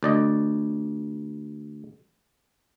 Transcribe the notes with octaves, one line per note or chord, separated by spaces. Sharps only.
D2 D5 D#5